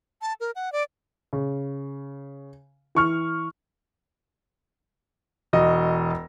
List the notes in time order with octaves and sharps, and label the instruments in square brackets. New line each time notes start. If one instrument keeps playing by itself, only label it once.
[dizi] A5
A#4
F#5
D5
[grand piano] C#3
E3 C#6 F6
E1 F#4 D#5